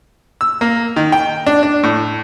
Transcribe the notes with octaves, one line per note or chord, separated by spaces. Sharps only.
E6
A#3
D#3
G5
D4
D4
A2